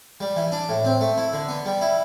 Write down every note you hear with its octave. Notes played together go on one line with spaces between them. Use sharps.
G3
E3
D4
A2
C4
A3
E4
D3
B3
G3
E4